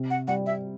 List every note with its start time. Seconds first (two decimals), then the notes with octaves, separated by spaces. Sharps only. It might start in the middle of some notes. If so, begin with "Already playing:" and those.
Already playing: C3
0.10 F#5
0.28 G3 F#5
0.46 E5